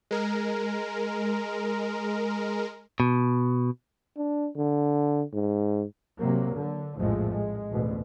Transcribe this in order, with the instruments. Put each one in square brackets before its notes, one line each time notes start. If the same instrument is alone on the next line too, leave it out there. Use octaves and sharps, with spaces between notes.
[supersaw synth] G#3 A#4
[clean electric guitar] B2
[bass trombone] D4
D3
G#2
[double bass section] C3 F#3 A#3
D3
A#1 F2 A2 F3 G#3 A3
G#3
A1 D2 B2